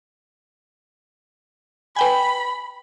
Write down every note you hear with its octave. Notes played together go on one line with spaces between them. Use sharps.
B4 G5 G#5 B5